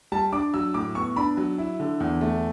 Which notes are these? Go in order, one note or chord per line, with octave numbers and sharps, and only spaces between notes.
G3 A5
D4 D6
F#3 E6
A2 D6
B3 C#6
D4 B5
F#3
E4
D3
E2
A3